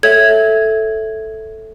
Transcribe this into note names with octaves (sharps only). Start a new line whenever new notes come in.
A4 C#5 E5 G#6